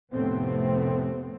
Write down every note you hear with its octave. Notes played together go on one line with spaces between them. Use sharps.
F1 A2 C3 A3 B3 C4